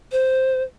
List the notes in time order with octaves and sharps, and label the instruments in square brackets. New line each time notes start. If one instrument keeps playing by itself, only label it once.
[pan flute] C5